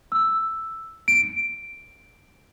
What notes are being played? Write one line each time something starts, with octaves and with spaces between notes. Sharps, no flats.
E6
D7